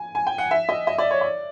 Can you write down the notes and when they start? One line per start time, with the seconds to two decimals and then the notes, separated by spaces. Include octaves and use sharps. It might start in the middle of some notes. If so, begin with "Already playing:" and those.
Already playing: G#5
0.15 G#5
0.27 G5
0.38 F#5
0.51 E5
0.69 D#5
0.87 D#5
0.98 D5
1.11 C#5
1.21 D5